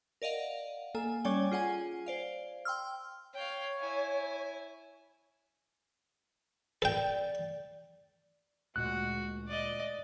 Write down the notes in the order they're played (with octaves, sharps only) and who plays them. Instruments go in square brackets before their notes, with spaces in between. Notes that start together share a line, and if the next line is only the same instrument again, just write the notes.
[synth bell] A#4 D5 D#5 F5 F#5
A#3 A4 G#5
G3 C#4 C#5 D5 G#5 G7
F4 G#4 F#5 G#5
C5 D5 F5
G5 C6 E6 F6
[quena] C#5 [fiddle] F5 G5
[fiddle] E4 G#5
[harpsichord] A4 G5 [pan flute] D5
[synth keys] D2 A#2 G#3 [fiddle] F#4 [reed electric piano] F#6
[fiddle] D5 D#5